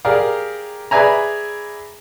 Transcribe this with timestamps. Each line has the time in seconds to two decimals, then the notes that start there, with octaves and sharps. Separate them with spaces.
0.05 G4 G#4 A#4 D5 F5
0.91 G#4 B4 D5 E5 G#5 A#5